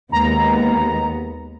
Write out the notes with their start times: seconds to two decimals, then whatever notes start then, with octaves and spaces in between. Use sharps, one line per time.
0.12 D#2 G#3 B3 A#5